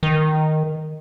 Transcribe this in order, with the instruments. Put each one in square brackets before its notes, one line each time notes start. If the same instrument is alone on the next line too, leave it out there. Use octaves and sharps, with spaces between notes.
[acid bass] D#3